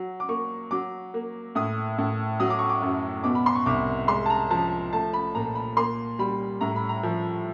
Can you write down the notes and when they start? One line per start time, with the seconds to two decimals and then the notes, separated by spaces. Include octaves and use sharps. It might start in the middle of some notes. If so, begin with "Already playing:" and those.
Already playing: F#3
0.20 D6
0.29 A#3 C#6
0.71 F#3 D6
1.14 A#3
1.55 A2 D#6
1.98 A2
2.40 F#3 D#6
2.50 D6
2.59 C#6
2.69 D6
2.82 F#2
3.24 B2 D6
3.35 B5
3.46 C6
3.55 C#6
3.66 C2 D6
4.08 G#3 C6
4.26 A5
4.30 A#5
4.51 F3 A5
4.93 A3 A5
5.13 B5
5.35 A#2 A#5
5.55 B5
5.77 A#3 C6
6.19 G3 B5
6.61 A2 A#5
6.76 B5
6.89 A#5
7.03 F3